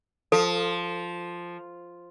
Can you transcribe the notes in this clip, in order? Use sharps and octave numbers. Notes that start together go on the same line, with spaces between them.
F3 A4